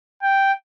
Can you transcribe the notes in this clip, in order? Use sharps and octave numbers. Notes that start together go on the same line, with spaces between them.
G5